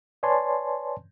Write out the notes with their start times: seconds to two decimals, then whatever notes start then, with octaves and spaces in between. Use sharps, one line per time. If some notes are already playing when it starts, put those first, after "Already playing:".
0.23 B4 C#5 D5 G#5 A5 C6